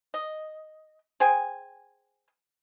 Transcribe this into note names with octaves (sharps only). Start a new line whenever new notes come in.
D#5
G#4 C5 G5 G#5